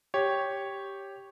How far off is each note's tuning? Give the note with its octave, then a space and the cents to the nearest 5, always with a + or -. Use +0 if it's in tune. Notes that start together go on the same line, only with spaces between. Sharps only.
G4 +0 C#5 -5